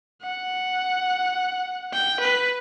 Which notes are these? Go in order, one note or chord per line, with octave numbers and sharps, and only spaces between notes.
F#5
G5
B4